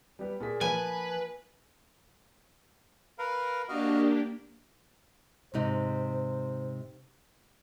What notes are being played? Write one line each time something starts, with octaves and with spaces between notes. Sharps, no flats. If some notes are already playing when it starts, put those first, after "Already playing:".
G3 B3 G4
A#2 G#4 B6
F3 A#3 B4 G#5
A#4 B4 F5
A#3 D4 F#4 G4 D#5 F5
G#2 C3 D#4 C5